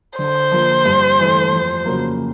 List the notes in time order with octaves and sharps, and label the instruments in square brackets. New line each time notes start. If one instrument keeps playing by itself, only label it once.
[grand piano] D3 [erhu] C5
[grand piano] F3 A#3
G2
E3 A3
F2
C#3 F#3 A#3